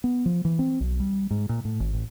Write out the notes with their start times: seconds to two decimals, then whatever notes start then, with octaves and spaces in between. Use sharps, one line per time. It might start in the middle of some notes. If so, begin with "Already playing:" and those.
0.04 B3
0.26 F3
0.45 E3
0.59 C4
0.80 B1
1.00 G3
1.31 G#2
1.49 A#2
1.65 A2
1.80 G#1
1.93 A1